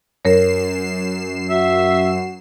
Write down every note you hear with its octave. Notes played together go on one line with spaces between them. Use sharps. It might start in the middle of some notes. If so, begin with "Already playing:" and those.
F#2 A#4 C#5 C7 E7
F#4 E5